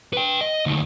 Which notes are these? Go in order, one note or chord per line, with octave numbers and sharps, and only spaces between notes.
B4 G5
D#5
D2 D#3